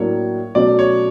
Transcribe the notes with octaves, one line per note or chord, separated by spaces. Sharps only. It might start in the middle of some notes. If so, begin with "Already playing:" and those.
Already playing: A2 F#3 A#3 D4 C#5
B2 F#3 A3 C#4 D5
C#5